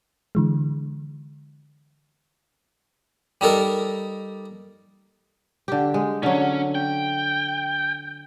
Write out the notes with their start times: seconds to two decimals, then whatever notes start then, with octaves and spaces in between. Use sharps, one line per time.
0.35 D3 E3 G#3
3.41 G3 D#4 A4 A#4
5.68 D3 G4
5.94 G#3
6.23 D3 F#3 C#4
6.75 G5